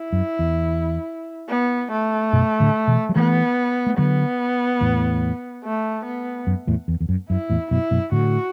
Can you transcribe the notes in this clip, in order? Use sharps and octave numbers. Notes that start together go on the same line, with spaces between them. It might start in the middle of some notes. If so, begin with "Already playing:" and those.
Already playing: E4
F#2
E2
B3
A3
F#2 B2
A2 D3
B2 E3
F#3
E3 A3 B3
A3
D3 F#3 B3
E2 A2
A3
B3
F#2
E2 A2
E2
E2
F#2
F#2 E4
E2 A2
F#2 B2 E4
F#2 B2
A2 D3 F#4